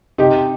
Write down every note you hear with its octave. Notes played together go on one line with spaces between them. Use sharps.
C3 D#4 G4